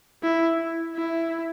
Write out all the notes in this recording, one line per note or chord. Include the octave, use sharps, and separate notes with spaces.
E4
E4